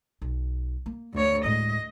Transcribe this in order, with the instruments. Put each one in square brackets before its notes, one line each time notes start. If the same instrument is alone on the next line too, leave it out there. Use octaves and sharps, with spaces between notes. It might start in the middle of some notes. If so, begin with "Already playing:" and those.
[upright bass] B1
A#3
[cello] D2 C#5
[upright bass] A2 G#3 [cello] D#5